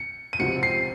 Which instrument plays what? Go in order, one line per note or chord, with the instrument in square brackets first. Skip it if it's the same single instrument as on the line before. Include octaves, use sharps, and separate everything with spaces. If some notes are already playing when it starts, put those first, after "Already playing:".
Already playing: [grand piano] C#7
D#7
[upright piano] C#2 C3 F3 C4 F#4 [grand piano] C#7
[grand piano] C7